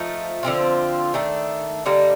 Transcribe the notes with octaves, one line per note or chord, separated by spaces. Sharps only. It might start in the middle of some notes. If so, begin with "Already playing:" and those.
Already playing: F3 A3 D#4
D3 F3 C4 F4
D#3 A3 D4 A4
D3 G3 A#3 D#4